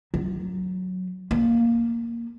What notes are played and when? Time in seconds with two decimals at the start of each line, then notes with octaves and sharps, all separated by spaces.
0.14 F#3
1.31 A#3